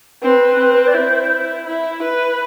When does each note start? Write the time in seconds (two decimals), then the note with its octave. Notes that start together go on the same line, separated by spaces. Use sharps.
0.23 C4 B4
0.59 C4
0.87 D5
0.94 E4 C5
1.66 E4
2.02 B4